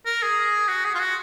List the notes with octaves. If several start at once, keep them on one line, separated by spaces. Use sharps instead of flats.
A#4
G#4
F#4
G#4
F4
F#4